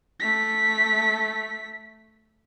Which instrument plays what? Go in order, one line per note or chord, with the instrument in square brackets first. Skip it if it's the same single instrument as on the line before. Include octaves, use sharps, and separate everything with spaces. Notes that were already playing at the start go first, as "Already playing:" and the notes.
[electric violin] A3 B6